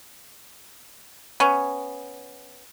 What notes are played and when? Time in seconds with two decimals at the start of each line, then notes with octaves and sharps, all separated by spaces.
1.40 B3 C#4